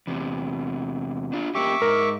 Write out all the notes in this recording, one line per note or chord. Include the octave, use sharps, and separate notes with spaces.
E2 C3
D4 F4
A#3 C#4 G4 E5 C#6 D6
G#2 A#4